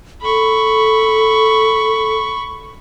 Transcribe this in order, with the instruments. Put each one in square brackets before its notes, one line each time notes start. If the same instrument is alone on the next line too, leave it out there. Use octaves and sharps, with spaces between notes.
[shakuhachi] A4 [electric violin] B5 C#6